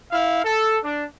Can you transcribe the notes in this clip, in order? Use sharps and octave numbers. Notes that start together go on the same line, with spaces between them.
E4 F5
A4
D4